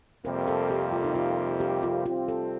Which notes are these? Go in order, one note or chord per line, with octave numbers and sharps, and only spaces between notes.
F2 C3 G3 A#3 A#4
A4
G4
F4
D#4
F4
G4
F4
C3 G3 C4 F4
A4